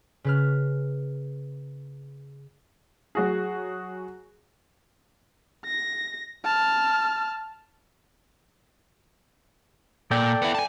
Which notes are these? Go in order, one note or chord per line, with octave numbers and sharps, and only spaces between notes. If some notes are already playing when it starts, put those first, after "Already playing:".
C#3 B4 F6
F#3 F#4 G#4
A#6
A5 F6
A#2 A4 D5 G5
B3 E4
G#5 A5